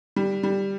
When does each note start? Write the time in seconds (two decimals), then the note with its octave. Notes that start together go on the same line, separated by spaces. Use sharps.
0.16 G3
0.43 G3